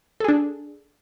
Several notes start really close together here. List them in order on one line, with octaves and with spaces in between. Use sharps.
A4 G#4 D4